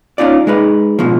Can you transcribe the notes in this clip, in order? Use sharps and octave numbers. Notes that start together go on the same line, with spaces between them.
C#4 D#4 F4 D5
G#3 D#4 B4
G#2 B2 F3